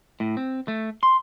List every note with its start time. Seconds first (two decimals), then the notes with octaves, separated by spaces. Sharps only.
0.20 A2
0.37 C4
0.68 A3
1.03 C6